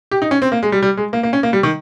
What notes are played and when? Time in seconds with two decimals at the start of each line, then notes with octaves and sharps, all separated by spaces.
0.11 G4
0.22 D#4
0.31 C#4
0.42 C4
0.52 A#3
0.63 G#3
0.72 G3
0.83 G3
0.97 G#3
1.13 A#3
1.23 A#3
1.33 C#4
1.43 A#3
1.53 G3
1.63 D#3